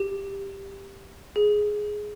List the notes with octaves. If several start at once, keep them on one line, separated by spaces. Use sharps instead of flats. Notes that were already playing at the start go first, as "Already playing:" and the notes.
Already playing: G4
G#4